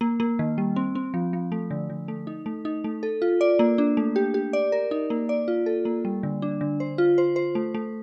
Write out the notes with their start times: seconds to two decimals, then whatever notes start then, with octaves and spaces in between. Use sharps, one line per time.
0.01 A#3
0.20 A#3
0.39 D#3
0.58 G3
0.76 C4
0.95 C4
1.14 F3
1.33 F3
1.52 A3
1.71 D3
1.90 D3
2.08 A3
2.27 D#4
2.46 A3
2.65 D#4
2.84 A3
3.03 A4
3.22 F4
3.41 D5
3.59 A#3
3.78 D4
3.97 A3
4.16 G4
4.34 G4
4.53 D5
4.72 A#4
4.91 D#4
5.10 A#3
5.29 D5
5.48 F4
5.66 A4
5.85 A#3
6.05 G3
6.23 D3
6.42 D4
6.61 D3
6.80 C5
6.98 F4
7.18 C5
7.36 C5
7.55 A3
7.74 A3